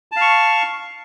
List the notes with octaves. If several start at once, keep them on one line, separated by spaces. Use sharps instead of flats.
F5 A5 C#6